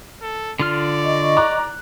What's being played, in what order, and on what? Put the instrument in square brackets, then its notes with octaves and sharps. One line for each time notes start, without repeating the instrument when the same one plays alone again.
[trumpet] A4
[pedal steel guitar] D3 F4 F6 [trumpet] D5
[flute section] D#5 C#6
[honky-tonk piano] A#5 D6 F#6